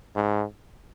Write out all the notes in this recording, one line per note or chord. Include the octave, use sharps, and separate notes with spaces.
G#2